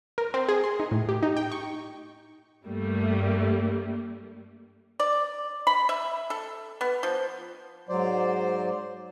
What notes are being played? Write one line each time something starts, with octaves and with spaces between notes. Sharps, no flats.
A#4
C4
G#4
C6
D#4
A2
G4
D#4
G5
C#6
G2 G3 A3 A#3
D5
B5
E5
A4
B3
F3
G#2 F#3 C5 D5